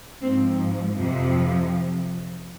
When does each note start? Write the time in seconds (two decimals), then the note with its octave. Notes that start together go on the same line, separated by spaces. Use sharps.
0.23 G#2 F3 C4
0.94 F2 C3 F3